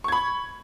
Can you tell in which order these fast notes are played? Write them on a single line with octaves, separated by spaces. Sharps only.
C#6 G#6 B5